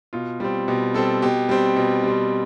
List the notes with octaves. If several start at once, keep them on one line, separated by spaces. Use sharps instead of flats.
B2 F4
G3 C4
B2 G4
G3 C4 A4
B2 G4
G3 C4
B2
G3 C4